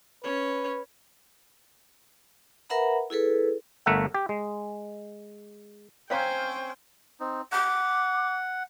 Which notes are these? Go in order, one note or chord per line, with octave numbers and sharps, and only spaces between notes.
C#4 B4 C#5
A#4 B4 E5 F#5 A#5 B5
E4 G#4 A4 B4
G1 A3 A#4 E5 F#5
G4
G#3
C4 C#4 C5 C#5 F5 G5 G#5 A#5
C4 D#4
F#5 D6